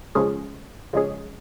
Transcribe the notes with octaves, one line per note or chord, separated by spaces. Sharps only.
C#3 F3 G#3 C#4 G#4
C#3 F3 G#3 C#4 G#4